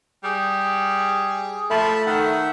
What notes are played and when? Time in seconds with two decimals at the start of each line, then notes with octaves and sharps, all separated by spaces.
0.24 G3 G#4
1.70 F3 A3 A5 B5
2.07 D#3 E5 F#5